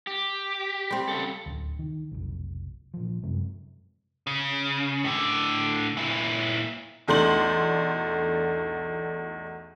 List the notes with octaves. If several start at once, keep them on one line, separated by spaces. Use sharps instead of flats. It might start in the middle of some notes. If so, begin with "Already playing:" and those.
G4
G3 C4
C#3 A4
D1 D2
D#3
F1 B1
A#2 F3
F#2 C3 G#3
C#3
A2 D3
A#2 E4
B1 E2 A3 D4 C6 F#7